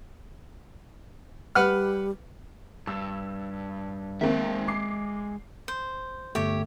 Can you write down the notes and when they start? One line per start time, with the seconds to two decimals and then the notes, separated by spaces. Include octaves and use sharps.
1.55 G3 B4 F#5 F6
2.87 G2 E6
4.21 D#3 G#3 A#3 C4 E5
4.68 D6 C7
5.68 C5
6.35 G1 A3 G4 C#5